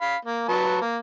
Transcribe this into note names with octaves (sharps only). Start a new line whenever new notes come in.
F5 B5
A#3
F#3 B4 A5
A#3